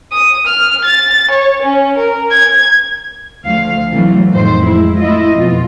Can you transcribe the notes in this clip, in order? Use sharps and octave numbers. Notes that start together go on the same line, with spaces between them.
D#6
F6
A6
C#5
C#4
A#4
G#6
D2 F3 F5
C3 E3 F#3 A3
F2 A2 D#3 C5
G#3 E4
A3 E4 F4 D#5
F2 B2 F4